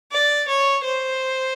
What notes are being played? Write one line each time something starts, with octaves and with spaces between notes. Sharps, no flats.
D5
C#5
C5